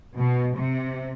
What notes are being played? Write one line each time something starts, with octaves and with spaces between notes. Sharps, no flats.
B2
C3